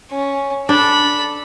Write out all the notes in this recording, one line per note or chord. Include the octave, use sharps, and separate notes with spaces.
C#4
D4 A4 B5